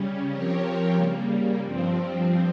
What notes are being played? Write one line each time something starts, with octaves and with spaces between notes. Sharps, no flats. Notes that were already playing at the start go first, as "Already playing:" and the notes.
Already playing: C#3 G3 C#4
F3 C4 G4 A#4 C#5
C#3 G3 A#3
G2 F3 C4